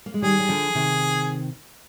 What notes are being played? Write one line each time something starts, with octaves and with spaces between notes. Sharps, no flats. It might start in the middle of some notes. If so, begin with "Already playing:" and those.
A#3
G#3
D#3 G3 G#4
G3
D3 F3
C3 D#3